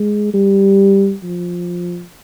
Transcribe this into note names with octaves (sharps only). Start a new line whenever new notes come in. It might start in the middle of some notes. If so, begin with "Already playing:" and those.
Already playing: G#3
G3
F3